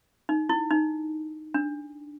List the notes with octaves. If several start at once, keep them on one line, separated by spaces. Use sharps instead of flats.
D#4
E4
D#4
D4